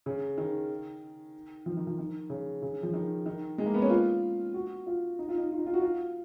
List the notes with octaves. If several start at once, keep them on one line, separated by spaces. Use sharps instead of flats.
C#3
D#3
F3
D#3
F3
D#3
C#3
C#3
F3
D#3
D#3
G#3
A#3
B3
C#4
F4
F#4
F4
D#4
F4
D#4
F4
D#4
F4
F#4
F4